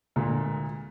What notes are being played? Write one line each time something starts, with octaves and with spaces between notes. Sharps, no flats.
D2 A#2 G#3